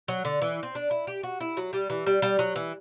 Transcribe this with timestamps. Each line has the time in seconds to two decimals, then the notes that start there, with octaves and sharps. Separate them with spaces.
0.08 F#3
0.25 D3
0.42 E3
0.63 C4
0.75 D4
0.91 E4
1.07 G4
1.23 F#4
1.40 E4
1.57 F#3
1.73 G3
1.90 E3
2.06 G3
2.22 G3
2.39 F#3
2.56 E3